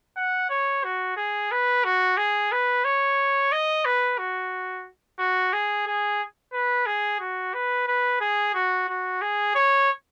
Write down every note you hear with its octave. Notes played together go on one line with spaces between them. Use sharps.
F#5
C#5
F#4
G#4
B4
F#4
G#4
B4
C#5
D#5
B4
F#4
F#4
G#4
G#4
B4
G#4
F#4
B4
B4
G#4
F#4
F#4
G#4
C#5